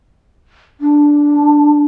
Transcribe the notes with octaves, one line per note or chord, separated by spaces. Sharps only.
D4